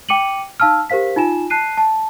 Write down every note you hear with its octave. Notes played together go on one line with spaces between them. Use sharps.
G5 D6 C#7 D#7 F#7
D#4 F5 A5 E6 F6
G4 A#4 C5 F5 B6
D#4 F4 G#5 E7
A5 F#6 C7 D#7
A5